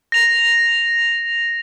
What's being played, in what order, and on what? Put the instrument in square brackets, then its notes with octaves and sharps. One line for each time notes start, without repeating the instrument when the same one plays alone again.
[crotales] A#6 F7